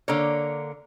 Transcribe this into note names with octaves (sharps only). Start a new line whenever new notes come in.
D3 A#3 C#5